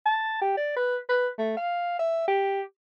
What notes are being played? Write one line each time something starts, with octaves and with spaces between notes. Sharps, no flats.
A5
G4
D5
B4
B4
A3
F5
E5
G4